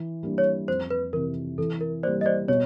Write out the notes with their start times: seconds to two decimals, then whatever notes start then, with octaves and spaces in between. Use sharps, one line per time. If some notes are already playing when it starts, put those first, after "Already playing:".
Already playing: E3
0.23 G3 A#3 D4
0.38 C#5
0.68 F2 C5
0.90 B4
1.13 C3 E3 A#4
1.58 E3 A4
1.81 A#4
2.03 G3 A#3 C5 D5
2.21 D#5
2.26 C5 D5
2.48 B2 C#5